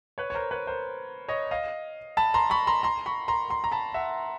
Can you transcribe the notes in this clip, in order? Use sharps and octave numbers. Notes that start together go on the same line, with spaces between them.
B4 C#5
C#5
A#4 C5
B4 C#5
A#4 C5
C#5 D#5
D#5 F5
A5 B5
A#5 C6
B5 C#6
A#5 C6
A#5 C6
B5 C#6
A#5 C6
A#5 C6
A#5
A5 B5
E5 F#5